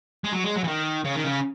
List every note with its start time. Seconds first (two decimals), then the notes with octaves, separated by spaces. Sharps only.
0.24 G#3
0.33 F#3
0.44 G#3
0.56 F#3
0.64 E3
0.68 D#3
1.05 C#3
1.15 D#3
1.25 C#3